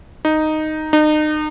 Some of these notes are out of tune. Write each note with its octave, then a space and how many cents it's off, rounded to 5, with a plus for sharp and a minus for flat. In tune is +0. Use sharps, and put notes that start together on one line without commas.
D#4 -5
D#4 -35